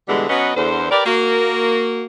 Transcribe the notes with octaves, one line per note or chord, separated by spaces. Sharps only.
B2 D3 E3 G3 G#3
F#3 B3 C#4 B4 D#5 F#5
E2 D3 C5
G4 A#4 B4 D5
A#3 F#4